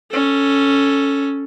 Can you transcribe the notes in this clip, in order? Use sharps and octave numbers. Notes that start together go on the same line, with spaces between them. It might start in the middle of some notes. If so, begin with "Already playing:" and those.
C#4 A4